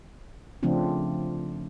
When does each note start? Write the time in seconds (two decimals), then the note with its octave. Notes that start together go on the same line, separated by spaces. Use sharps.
0.63 C#3 F3 A3 C4 D4 F4